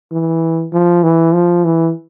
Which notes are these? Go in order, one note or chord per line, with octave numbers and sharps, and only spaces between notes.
E3
F3
E3
F3
E3